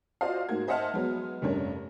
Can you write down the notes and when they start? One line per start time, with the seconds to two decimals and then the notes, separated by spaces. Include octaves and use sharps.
0.21 F4 F#4 C5 D5 D#5 F5
0.49 G#2 A#3 F#4 G#6
0.68 C5 D#5 E5 F#5 A5 F6
0.94 F#3 G#3 B3
1.42 F1 G2 C#4 D4 A#4 C#5